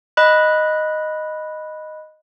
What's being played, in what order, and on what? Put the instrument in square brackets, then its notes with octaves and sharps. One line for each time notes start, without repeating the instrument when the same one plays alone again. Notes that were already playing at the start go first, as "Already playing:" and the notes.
[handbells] D#5 B5 F#6